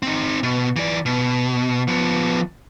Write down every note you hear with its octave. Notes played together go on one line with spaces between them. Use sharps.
C4 D#4
B2
E3 D5
B2
F3 B3